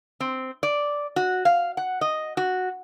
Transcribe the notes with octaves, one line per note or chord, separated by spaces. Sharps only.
C4
D5
F#4
F5
F#5
D#5
F#4